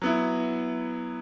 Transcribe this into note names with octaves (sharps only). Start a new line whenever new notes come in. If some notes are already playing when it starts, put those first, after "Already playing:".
F#3 B3 E4